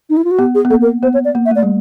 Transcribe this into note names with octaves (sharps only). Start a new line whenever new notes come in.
D#4
E4
F4
F#4
B3 G4
G#4
B3
A#3 A4
A#4
B3 C5
C#5
D5
A#3
E5
A3 D5
G3